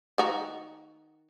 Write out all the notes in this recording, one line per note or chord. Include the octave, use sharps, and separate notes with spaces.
D#3 F#4 A#5